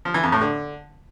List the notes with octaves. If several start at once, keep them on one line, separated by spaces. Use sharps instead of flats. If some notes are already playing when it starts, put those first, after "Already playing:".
F3
E3
F2
A2
D3